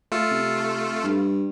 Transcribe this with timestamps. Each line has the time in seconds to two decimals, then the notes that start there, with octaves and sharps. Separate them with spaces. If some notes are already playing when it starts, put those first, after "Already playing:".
0.12 A3 F4 A4
0.31 C3
1.04 G2